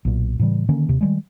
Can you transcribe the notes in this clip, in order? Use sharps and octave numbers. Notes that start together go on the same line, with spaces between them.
B1 A#2
A2 C#3 E3 G3
D3 D#3 A#3 C#4
D#2 C3
D#3 G3 G#3